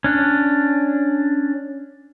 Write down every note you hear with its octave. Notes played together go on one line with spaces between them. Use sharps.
C#4 D4